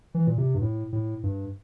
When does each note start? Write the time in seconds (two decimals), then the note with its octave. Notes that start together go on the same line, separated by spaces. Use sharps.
0.14 E3
0.27 A#2
0.38 C3
0.55 G2
0.62 A2
0.93 A2
1.23 G2